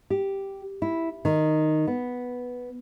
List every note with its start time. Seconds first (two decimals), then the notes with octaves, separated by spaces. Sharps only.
0.10 G4
0.82 E4
1.25 D#3
1.87 B3